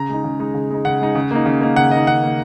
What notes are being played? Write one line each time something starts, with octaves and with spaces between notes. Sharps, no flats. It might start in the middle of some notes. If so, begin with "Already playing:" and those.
Already playing: C#3 A#5
G#3 D#4
C#3
G#3 D#4
C#3
G#3 D#4
C#3 F#5
G#3 D#4
C#3
A#3 D#4
C#3
A#3 D#4
C#3 F#5
A#3 D#5
D#4
C#3 F#5
A#3 D#4